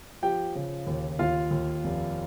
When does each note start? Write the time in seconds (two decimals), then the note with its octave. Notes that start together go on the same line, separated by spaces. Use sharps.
0.22 F3 G4 G5
0.55 C#3
0.87 D#2
1.19 D#2 F4 F5
1.51 D#2
1.84 F1